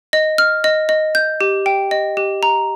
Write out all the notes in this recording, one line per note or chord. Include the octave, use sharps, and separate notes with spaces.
D#5
F6
D#5
D#5
G6
G4
G5
D#5
G4
A#5